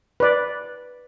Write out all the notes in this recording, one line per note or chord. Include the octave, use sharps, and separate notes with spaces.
B4 D5